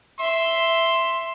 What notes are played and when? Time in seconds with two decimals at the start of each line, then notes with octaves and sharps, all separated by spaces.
0.19 E5 C6